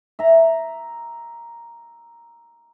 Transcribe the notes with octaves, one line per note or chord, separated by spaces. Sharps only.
E5 A#5